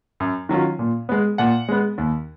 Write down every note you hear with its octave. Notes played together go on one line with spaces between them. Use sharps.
F#2
D#3 F#3 C#4 F4
A#2
G#3 B3
A#2 F#5
G#3 B3
D#2